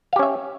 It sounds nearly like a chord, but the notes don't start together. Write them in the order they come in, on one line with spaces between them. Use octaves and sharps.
F5 G4 C#4 E5